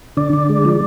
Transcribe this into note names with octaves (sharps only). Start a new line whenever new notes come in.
D3 D5
D3
G#3
F3